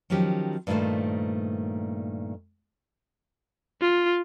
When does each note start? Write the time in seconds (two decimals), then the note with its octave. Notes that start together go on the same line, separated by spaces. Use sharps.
0.10 D#3 F3 F#3 C#4 G4
0.67 G2 A#2 D#3 F#3 A3 C5
3.81 F4